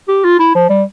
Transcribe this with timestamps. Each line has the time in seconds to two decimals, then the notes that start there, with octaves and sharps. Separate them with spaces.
0.08 G4
0.24 F4
0.39 E4
0.55 F3
0.69 G3